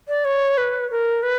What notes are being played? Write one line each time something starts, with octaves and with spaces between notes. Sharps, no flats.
D5
C#5
B4
A#4
B4